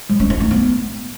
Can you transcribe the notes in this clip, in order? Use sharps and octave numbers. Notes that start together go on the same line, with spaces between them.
G#3
C#4
D#4
A3
B3